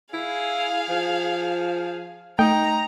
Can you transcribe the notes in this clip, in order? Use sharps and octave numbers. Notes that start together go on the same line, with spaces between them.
E4 G#4 F5
F3
A3 D#4 G5 A#5